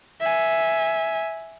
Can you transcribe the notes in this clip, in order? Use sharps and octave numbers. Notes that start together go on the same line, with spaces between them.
E5 G#5